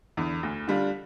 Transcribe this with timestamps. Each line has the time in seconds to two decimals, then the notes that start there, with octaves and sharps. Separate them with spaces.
0.17 E2 D3
0.43 D2
0.68 D3 G3 D4 F4